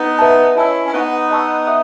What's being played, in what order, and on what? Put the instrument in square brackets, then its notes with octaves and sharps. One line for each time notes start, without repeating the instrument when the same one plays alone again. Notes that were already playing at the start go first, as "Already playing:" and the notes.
Already playing: [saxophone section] B3 D#4
[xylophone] B4 E5 A5
[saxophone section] C#4 E4 [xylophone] D#5 A5 E6
[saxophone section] C#4
[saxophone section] B3 D#4 [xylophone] F#5 C#6 F#6
[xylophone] D#5 A5 C#6 E6
E5 D#6